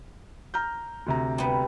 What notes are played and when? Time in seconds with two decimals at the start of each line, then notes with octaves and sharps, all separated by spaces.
0.54 A#5 F6 G6
1.06 D2 C3 A#5
1.38 G3 B3